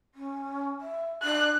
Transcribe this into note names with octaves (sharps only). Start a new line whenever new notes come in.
C#4
E5
D4 F#6